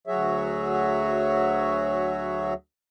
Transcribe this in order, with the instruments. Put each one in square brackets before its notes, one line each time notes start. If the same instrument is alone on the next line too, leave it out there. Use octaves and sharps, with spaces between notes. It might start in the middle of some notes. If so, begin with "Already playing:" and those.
[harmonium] D2 F#3 F#4 G#4 C#5 E5